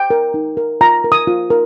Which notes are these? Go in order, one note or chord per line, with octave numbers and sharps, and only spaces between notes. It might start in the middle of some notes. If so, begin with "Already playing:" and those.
Already playing: G5
A#4
D#4
A#4
F4 A#5
A#4
D#6
F4
A#4